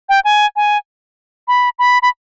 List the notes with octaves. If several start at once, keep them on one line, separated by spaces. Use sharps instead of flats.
G5
G#5
G#5
B5
B5
B5